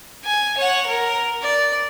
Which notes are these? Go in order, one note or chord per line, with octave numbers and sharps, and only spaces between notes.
G#5
C#5 F#5
A#4
D5